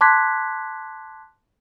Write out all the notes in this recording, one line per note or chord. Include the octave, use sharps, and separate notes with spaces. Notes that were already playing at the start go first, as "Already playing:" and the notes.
A5 C6 D6 F#6 G#6 B6